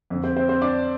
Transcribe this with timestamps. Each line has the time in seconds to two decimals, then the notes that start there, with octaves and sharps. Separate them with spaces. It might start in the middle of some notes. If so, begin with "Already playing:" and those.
0.10 F2 D3
0.24 C4 C5
0.36 C4 C5
0.49 C4 C5
0.62 D4 D5